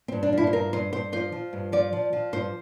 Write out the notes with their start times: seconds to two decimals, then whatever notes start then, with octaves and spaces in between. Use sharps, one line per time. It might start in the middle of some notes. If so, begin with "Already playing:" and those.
0.08 G2 C4
0.23 D4
0.33 F3 E4
0.47 C5
0.53 G2 A#4
0.73 G2 C5
0.93 G2 C5
1.12 F3 C5
1.32 F3
1.53 G2
1.72 F3 D5
1.93 F3
2.13 F3
2.33 G2 C5